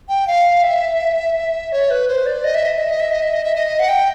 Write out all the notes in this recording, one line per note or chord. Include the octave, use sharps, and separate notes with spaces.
G5
F5
E5
C#5
B4
C5
D5
D#5
E5
D#5
E5
D#5
E5
D#5
E5
D#5
E5
D#5
F#5
G5